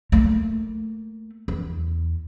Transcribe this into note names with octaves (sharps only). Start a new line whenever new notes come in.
A3 A#3
E2